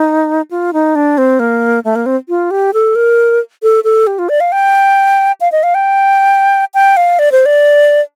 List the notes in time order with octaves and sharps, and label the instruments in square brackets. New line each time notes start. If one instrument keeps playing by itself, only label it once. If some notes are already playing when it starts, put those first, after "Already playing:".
Already playing: [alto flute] D#4
F4
D#4
D4
C4
A#3
A3
A#3
C4
F4
G4
A4
A#4
A4
A4
G4
F4
D5
F5
G5
F5
D#5
F5
G5
G5
F5
D5
C5
D5